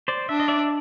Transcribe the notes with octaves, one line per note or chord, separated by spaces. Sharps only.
C5 D5
D4 E5
D#5
D5 E5